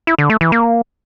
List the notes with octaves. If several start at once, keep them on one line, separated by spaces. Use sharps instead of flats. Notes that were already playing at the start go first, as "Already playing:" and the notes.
E4
D3
A3
E3
A#3